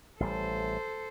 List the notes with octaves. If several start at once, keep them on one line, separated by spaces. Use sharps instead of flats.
A1 G3 A4 C5